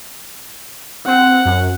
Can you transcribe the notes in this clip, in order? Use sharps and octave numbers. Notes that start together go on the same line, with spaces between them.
C4 F#5
F#2